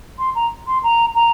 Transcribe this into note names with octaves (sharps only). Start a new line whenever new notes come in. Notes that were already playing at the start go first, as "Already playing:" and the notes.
C6
A#5
C6
A#5
A#5